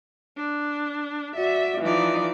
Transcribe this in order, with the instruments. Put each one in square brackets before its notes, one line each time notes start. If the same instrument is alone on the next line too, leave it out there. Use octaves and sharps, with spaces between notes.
[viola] D4
[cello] F#4 D5 [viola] E5
[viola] E3 D5 [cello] F3 D#4